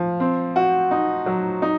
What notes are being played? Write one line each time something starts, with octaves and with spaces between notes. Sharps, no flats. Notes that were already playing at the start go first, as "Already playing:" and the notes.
Already playing: F3
C4
F#4
D#4
F#3
D#4